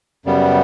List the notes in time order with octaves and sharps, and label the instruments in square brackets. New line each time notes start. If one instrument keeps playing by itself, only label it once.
[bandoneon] F#2 C#3 G3 B3